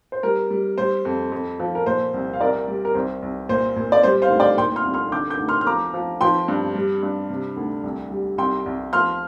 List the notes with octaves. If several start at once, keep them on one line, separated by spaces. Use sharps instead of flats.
C5
G3 A#4
G3
G3 C5
F2
F2
F3
A#4
A#2 C5
C2
F5
C2 A#4 D5
G3
A#4
C2 C5
C2
A#2 C5
A#2
D5
G3 C5
C5 F5
D2
D5 G5
A#2 G5 C6
C6 F6
C2
C6 F6
D3 D6 G6
D6 G6
D2
C6 F6
F6
F3 A#5 D6
F3
F3 G5 C6
G2
G3
G2
C3
D2
C2
G3
C2 G5 C6
C2
F3 C6 F6